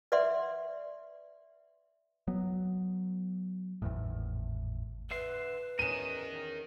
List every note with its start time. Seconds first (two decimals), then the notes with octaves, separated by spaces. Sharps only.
0.12 B4 D5 E5 F#5 C6
2.28 F#3 B3
3.82 G#1 E2 A2
5.11 D3 B4 E5 C6
5.79 E2 C#4 A#4 D#5 D#7 E7